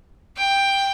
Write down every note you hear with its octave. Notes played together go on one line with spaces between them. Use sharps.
G5